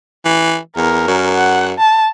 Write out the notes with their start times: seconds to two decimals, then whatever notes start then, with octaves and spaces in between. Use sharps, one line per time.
0.25 E3
0.76 E2 A#4
1.07 F#2
1.36 F#5
1.79 A5